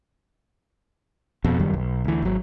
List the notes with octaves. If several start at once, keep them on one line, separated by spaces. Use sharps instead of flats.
F2 B2
F1 F#2 D#3 G3
B1
D2 E3
G#1 F#3